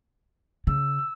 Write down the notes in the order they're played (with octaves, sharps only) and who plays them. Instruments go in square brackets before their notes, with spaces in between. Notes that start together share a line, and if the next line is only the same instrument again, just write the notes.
[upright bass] C#3 [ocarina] E6